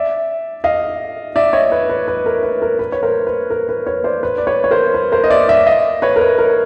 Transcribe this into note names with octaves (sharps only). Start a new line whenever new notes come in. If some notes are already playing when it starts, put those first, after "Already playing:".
Already playing: D5 E5
D#5 F5
D5 E5
C#5 D#5
B4
B4
B4
A#4
B4
A#4
B4
C#5
A#4 C5
B4
A#4
B4
B4 C#5
C5 D5
B4
D5
B4 C#5
C#5
A#4 C5
B4
A#4 C5
D#5
D5 E5
D5 E5
D#5 F5
B4 C#5
A#4
B4
A#4